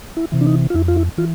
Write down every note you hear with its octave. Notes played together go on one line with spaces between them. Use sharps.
E4
C3 E3
D4
D#4
F4
F2 E4
F4
E4
E3 F4